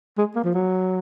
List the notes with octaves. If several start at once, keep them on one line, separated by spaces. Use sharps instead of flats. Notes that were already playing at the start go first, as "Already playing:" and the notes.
G#3
A#3
F3
F#3